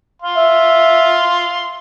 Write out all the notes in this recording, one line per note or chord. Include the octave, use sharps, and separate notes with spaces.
F5 C6
E5